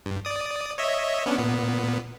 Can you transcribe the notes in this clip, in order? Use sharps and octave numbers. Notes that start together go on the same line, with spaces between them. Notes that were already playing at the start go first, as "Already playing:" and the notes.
G2
D5 D#6
C#5 D#5 E5
B3 C#4 D4
A#2 B3